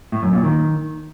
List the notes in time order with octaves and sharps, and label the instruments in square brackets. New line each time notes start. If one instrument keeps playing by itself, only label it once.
[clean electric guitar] A2
F#2
A#2
D#3